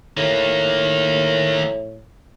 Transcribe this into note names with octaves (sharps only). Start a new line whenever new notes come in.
A2 D#3 A#3